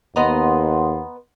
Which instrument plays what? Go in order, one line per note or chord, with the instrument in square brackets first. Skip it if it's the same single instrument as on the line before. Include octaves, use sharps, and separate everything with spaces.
[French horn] D#2 [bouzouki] B3 D#5 A#5 [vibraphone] F#5 C6